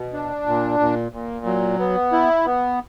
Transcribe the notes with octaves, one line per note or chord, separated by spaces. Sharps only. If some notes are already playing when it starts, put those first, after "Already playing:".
Already playing: B2
D4
A#2
A#2
A#2
F#3
B3
E4
B3